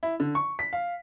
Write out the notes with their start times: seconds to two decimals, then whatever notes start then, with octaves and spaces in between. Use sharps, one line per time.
0.03 E4
0.20 D3
0.35 C#6
0.59 B6
0.73 F5